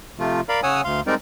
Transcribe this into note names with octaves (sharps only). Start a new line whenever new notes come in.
C3 F3 A3 F4
A#4 D5 F5 B5
C#3 C#5 F#5 G#5 D#6 E6
D2 F5 C6
G3 G#3 C4 D#4 A#4 D5